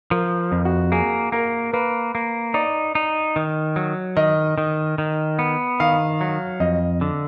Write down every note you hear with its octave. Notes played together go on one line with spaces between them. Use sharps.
F3 A#4
F2
F#4
A#3 G#4
A#3 A#4
A#3 B4
A#3
D#4 D5
D#4
D#3
F#3
D#3 D#5
D#3
D#3
B3
D#3 F5
F#3
F2 D#5
D3